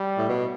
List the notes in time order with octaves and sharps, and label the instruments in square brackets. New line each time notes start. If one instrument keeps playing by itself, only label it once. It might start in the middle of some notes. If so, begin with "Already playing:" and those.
Already playing: [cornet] G3
[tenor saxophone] A2
B2